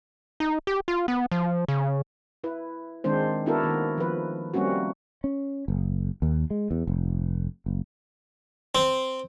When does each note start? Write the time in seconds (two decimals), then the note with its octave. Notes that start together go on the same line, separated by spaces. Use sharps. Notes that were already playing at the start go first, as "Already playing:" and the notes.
0.40 D#4
0.67 G4
0.88 F4
1.08 B3
1.32 F3
1.68 C#3
2.44 E4 B4
3.04 D#3 G#3 C4 D4 C5
3.46 B3 D4 E4 F#4 A4 A#4
3.63 D#3 A#3
3.98 F3 B4
4.54 G3 A3 A#3 C4 C#4 F#4
5.24 C#4
5.68 F#1
6.22 D#2
6.50 G#3
6.71 E2
6.87 F1
7.66 F#1
8.75 C4